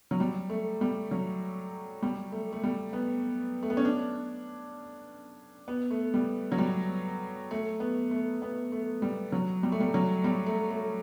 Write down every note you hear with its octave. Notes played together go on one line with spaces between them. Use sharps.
F#3
G3
A3
G3
F#3
G3
A3
A3
G3
B3
A3
B3
C#4
D4
B3
A3
G3
F#3
G3
A3
B3
A3
B3
A3
G3
F#3
G3
A3
G3
F#3
G3
A3
A3